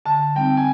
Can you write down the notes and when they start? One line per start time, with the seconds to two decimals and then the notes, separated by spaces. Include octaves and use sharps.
0.05 D3 A5
0.36 G3 C4 D#4 G5
0.57 G#5